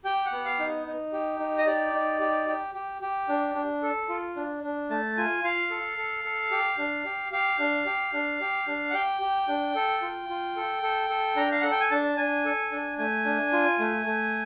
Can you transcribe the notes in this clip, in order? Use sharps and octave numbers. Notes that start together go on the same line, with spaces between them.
G4 G5
F#5
B3
F5
D#4
D#4
G4
D#4
D#5
G4 D5
D#4
G4
G4
G4
G4
D4
D4
A4
F4
D4
D4
A3 A5
F4 G#5
F4 F5
A4
A4
A4
G4
D4
G4
G4 F5
D4
G4
D4
G4
D4
F#5
G4 G5
G4
D4
A4
F4
F4
A4
A4
A4
D4 A#5
F5
A4 F#5
G5
G#5
D4 A5
D4 G#5
A4
D4
A3 G#5
D4
F4
A3
A3